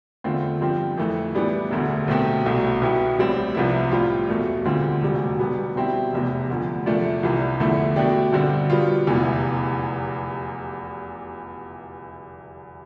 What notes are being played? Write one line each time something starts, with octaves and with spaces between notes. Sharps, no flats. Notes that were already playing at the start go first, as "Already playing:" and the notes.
E2 D3 A3 C4 F4
G2 F3 C4 G4
F2 E3 A3
A2 E3 G3 B3 D4
E1 D2 D3 A3
B1 B2 A3 C4 G4
C2 B2 A3
B1 B2 B3 E4 G4
A1 A2 G3 C4
C2 C3 F3 B3 E4
A2 G3 C4 F4
E2 B2 A3
D2 D3 G3 C4 F4
F1 E2 B2 G3
B1 B2 G3 B3
B2 G3 C4 E4 G4
F1 E2 C3
D2 D3 F3
E2 C3 F3 A3 D4
C2 C3 E3
E2 D3 F3 A3 E4
B2 A3 D4 G4
G2 D3 G3 C4
B2 G3 B3 F4
F1 E2 C3 E3